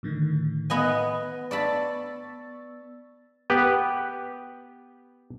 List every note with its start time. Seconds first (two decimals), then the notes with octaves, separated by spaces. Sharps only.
0.03 A2 D3 D#3
0.70 B3 D#5 G#5
1.51 D5 A5 B5 C#6 E6 A6
3.50 B3 G4 B4